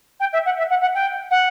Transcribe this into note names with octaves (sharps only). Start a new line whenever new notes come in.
G5
E5
F#5
E5
F#5
F#5
G5
F#5